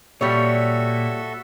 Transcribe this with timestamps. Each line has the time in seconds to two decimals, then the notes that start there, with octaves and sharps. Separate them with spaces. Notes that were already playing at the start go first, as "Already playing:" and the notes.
0.21 A#2 G3 F#4 A4 C#5 E5